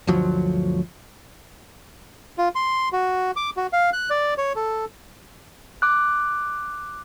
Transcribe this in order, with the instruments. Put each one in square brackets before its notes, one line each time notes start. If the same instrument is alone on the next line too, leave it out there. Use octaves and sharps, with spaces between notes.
[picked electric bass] G1 D2 F3 F#3
[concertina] F4
C6
F#4
D6
F#4
F5
F#6
D5
C#5
A4
[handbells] D6 F#6